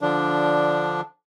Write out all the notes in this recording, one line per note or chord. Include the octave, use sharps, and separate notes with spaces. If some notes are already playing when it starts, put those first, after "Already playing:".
D3 F3 D4